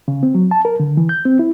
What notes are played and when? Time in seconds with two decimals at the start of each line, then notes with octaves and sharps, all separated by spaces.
0.08 C#3
0.23 C4
0.35 F#3
0.51 A5
0.65 A#4
0.80 D3
0.97 E3
1.09 G6
1.26 C4
1.39 E4